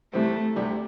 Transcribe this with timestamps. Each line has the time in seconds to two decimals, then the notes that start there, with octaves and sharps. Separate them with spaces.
0.13 C2 C3 E3 G3 A3 C4
0.56 D2 C3 G3 D4 G4